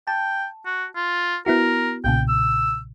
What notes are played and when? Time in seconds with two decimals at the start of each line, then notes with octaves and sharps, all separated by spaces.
0.08 G5 A5
0.66 F#4
0.96 F4
1.46 B3 E4 F#4 A#4
2.04 B1 A#2 C#3 G5
2.29 E6